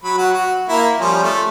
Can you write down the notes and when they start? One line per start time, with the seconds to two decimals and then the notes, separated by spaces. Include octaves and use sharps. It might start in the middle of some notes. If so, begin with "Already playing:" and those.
0.04 F#3 B5
0.18 F#3 F#4
0.34 F#4
0.69 A#3 E4 A#4
1.00 F3 G3 C#4
1.23 A3